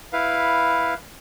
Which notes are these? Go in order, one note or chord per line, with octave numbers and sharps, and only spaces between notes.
E4 B4 F5